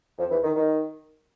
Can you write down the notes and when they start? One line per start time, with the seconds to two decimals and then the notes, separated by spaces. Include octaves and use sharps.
0.17 F2 F3
0.31 E2 E3
0.44 D#3
0.56 D#3